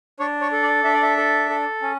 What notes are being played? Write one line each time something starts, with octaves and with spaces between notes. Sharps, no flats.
D4 C#5
C#5
A4
D5
D4 E5
D5
E5
A4
A4
C#4